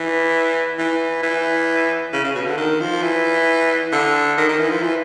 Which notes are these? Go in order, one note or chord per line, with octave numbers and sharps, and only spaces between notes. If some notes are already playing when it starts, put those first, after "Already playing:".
Already playing: E3
E3
E3
C#3
C#3
B2
D3
D#3
F3
E3
D3
D#3
D#3
E3
F3
E3